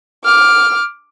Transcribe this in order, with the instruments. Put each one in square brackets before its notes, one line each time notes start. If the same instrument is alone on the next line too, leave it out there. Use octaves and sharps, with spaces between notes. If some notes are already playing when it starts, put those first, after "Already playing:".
[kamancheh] D6 F6